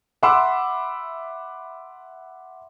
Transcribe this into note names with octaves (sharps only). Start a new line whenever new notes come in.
E5 F#5 B5 C6 D6 E6